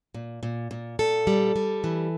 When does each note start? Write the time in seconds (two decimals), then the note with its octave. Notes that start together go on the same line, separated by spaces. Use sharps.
0.14 A#2
0.43 A#2
0.71 A#2
0.99 A#2 A4
1.27 G3
1.56 G3
1.84 E3